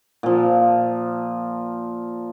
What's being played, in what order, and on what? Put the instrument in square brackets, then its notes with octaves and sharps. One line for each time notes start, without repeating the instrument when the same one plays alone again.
[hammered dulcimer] A#2 F3